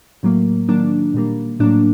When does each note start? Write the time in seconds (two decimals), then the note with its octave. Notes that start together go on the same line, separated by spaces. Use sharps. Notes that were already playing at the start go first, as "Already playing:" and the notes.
0.23 A2 F#3 A#3
0.69 D#3 F#3 A#3 D4
1.14 A#2 G3 A#3
1.60 A2 F#3 A#3 D4